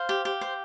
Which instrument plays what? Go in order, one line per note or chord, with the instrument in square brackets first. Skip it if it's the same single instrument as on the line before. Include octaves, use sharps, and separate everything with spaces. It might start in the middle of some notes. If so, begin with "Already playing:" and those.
Already playing: [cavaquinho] C5 F5
G4
G4
C5